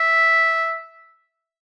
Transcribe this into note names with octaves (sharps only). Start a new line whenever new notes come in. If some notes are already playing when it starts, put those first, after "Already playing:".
Already playing: E5